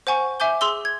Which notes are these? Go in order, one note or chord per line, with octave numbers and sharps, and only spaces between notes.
C5 F#5 G#5 C#6
E5 G#5 D6 G6 G7
G#4 C6 E6 G7
G#6